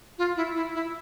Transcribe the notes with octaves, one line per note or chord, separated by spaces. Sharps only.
F4
E4
E4
E4